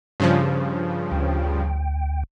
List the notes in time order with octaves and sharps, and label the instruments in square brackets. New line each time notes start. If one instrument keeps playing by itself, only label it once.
[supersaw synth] G2 C#3 F3
[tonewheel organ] D2 G5